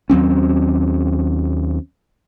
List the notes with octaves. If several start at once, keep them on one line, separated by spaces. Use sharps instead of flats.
D#2 F#3 C4 C#4